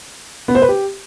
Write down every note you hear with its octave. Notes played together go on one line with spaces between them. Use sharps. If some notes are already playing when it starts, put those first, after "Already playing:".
B3
C5
B4
G4